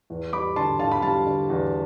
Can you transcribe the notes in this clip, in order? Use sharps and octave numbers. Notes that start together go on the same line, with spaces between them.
E2
G3 B5 D6
D3 A5 C6
D3 F5 A5
B5
G3 F5 A5
D3
E2